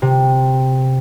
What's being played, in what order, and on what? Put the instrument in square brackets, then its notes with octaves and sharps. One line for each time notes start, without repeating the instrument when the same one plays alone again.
[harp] C3